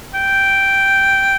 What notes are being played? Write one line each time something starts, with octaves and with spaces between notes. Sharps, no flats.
G5